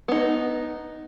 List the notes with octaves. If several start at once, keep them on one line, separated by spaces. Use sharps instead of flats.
B3 D#4